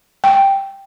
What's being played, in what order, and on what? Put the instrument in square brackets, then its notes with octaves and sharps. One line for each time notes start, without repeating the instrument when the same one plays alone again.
[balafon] G5